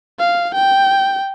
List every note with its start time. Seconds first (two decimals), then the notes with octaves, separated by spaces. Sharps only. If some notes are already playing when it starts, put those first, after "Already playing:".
0.19 F5
0.55 G5